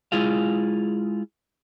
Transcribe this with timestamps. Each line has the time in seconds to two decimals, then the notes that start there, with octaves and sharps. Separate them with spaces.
0.12 G#3 E4 F4 G#4 F5